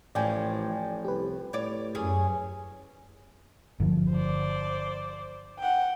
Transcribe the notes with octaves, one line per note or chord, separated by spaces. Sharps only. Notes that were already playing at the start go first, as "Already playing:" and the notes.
A1 A2 F3 D5 G5 G#5
C2 G4 B4
A2 C#5 D5
F#2 C#4 G#4
G1 D3 F3
C5 D5
F#5 G5